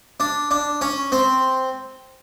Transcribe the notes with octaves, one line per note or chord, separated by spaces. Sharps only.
D4
D4
C#4
C4